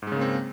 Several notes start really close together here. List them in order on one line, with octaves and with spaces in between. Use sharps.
G#2 G#3 C#3 A#3 C4